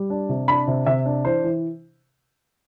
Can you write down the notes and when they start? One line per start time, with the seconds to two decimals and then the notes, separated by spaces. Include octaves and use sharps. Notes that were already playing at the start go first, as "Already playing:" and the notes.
Already playing: G3
0.10 D4
0.29 C3
0.48 D4 B5
0.67 C3
0.86 C3 E5
1.06 D4
1.25 E3 C5
1.44 E3